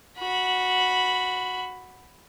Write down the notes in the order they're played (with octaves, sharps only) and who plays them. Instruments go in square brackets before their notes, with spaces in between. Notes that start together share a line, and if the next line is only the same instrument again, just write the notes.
[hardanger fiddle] F#4 B5